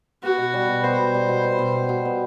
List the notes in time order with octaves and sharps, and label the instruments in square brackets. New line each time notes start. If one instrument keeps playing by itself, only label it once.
[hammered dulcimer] B3 [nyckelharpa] F#4
[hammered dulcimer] B2
G3
B2
[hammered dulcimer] B3 [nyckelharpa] C5
[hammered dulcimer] B2
G3
B2
B3
B2
G3
B2
B3